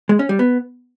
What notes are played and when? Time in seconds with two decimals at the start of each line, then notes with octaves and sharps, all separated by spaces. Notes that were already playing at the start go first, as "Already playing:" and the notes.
0.09 G#3
0.19 C#4
0.29 G3
0.39 B3